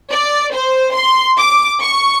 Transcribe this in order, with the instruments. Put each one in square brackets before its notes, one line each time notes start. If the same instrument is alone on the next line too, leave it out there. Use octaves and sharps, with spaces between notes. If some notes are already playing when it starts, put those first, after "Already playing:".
[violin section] D5
C5
C6
D6
C#6